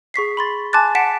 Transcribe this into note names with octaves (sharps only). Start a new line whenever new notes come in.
G#4 C#6 B6 C7
B5 C6 A6
G#5 A5 C6 D6 F#6 A6
F#5 A5 B6 D7 E7